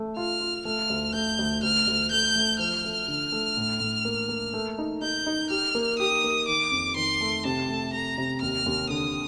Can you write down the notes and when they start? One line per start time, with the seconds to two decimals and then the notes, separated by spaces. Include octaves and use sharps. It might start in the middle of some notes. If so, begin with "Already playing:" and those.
Already playing: A3
0.17 F4 F6
0.41 F4
0.65 A3 F6
0.90 D2
1.13 A3 G6
1.39 D2
1.63 D2 F6
1.87 D2
2.10 A3 G6
2.36 A3
2.59 F3 F6
2.84 A3
3.08 D3
3.32 A3
3.57 A2
3.80 A2
4.05 A#3
4.29 A#3
4.54 A3
4.78 D#4
5.02 D#4 G6
5.26 D#4
5.50 G4 F6
5.75 A#3
5.99 G4 D#6
6.24 A#3
6.48 D#3 D6
6.72 F2
6.96 D#3 C6
7.21 A3
7.45 C3 A5
7.69 A3
7.93 A3 A#5
8.18 C3
8.41 D#2 F6
8.66 D#2
8.90 D3 D#6